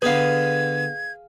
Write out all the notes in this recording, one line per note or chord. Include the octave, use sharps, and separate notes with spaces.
D3 B3 G#4 B4 F5 G#5 G#6